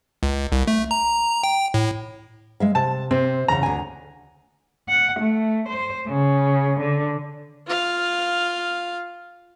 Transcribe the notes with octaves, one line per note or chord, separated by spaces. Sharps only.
C#2
C2
A3
A#5
G5
A2
G#3 E5 F5
C3 A5
C3 C4
E2 C#3 A#5
D2 G#5
F#5
A3
C5
C#3
D3
F4 F5